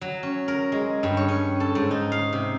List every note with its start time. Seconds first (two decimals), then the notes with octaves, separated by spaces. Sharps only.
0.01 F#3
0.23 C#4
0.48 A#4
0.72 G#3
1.03 G2
1.17 C#5
1.28 C#4
1.60 A4
1.75 G#2
1.91 D#4
2.12 F5
2.33 C3